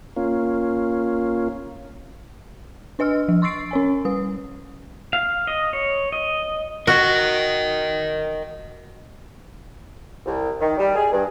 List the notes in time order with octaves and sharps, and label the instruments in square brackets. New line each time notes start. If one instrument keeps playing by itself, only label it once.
[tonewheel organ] A#3 C#4 F4
[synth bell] D4 B4 D#5 E6 F6
F3
C6 C#6 E6 A6 C7 D7
C#4 C#5 G#5
G3 B4 D#6
[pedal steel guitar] F5
D#5
C#5
D#5
[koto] F#4 [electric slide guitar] A#4 D#5
[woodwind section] C2
D#3
G3
G#4
G2